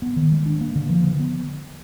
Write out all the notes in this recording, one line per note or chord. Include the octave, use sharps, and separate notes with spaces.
B3
D#3
G#3
D4
A#3
D3
F3
D3
B3